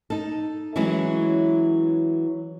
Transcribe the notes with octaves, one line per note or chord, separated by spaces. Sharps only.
D#4 A4
E3 F#3 G#3 C#4 E4